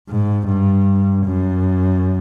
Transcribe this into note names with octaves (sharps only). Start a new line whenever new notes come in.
G#2
G2
F#2